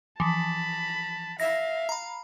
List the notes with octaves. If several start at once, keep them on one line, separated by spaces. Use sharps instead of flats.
E3 F3 A5 B5
E5 F5 A#6
A#5 B5